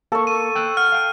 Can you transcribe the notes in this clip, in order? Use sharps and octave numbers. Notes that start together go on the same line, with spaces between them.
A#3 A4 C#6
D#7
G5 E6 F#6
F#5 F6
F5 G5